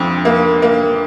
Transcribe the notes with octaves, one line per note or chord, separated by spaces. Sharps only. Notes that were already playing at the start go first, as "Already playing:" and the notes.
Already playing: F2 D3
A#3
A#3